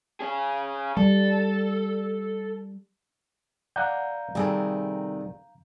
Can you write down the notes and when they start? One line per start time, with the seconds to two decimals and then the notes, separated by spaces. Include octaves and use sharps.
0.20 C#4 G#4
0.97 G3 A4
3.76 D5 F5 F#5 A#5 G6
4.35 F2 C3 D#3 G3 G#4 A4